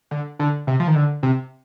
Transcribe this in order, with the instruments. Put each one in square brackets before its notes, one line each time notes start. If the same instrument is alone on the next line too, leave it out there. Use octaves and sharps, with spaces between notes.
[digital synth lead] D3
D3
C3
F3
D#3
D3
C3